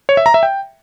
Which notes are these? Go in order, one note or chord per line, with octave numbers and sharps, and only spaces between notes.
C#5
E5
A#5
E5
G5